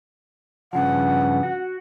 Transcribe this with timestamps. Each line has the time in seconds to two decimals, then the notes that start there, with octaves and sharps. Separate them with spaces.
0.73 G2 C#3 F3 F#5
1.43 F#4